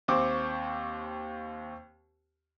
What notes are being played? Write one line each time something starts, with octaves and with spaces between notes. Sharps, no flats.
D#2 C4 C5 C#6 D6